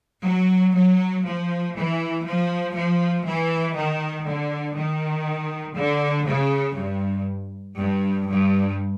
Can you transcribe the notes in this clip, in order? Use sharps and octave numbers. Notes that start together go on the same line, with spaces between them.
F#3
F#3
F3
E3
F3
F3
E3
D#3
D3
D#3
D3
C#3
G2
G2
G2